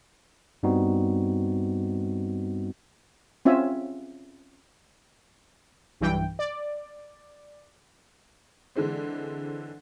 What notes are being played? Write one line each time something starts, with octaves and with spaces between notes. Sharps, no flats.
G2 G3 B3 C4 D#4 F#4
C4 C#4 F4 E5 G#5
B1 G2 E3 G5
D5
D3 E3 G#3 C4